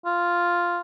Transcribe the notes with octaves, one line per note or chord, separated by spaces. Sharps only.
F4